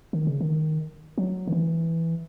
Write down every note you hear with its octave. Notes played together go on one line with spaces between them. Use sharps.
D#3
C#3
D#3
F#3
D#3
E3